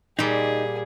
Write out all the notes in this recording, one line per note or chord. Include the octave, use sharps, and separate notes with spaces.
A#2 G3 D#4 G#4